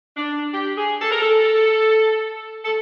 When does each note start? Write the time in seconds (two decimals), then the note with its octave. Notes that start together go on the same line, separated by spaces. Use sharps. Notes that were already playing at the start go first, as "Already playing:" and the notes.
0.17 D4
0.53 G4
0.78 G#4
1.02 A4
1.11 A#4
1.20 A4
2.65 A4